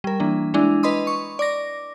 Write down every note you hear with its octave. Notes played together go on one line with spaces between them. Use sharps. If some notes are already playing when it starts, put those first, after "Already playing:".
G3 A#4
E3 A#3 D4
G#3 D4 E4
B4 D#5 B5 C6 D#6
C#6
D5 D6 A#6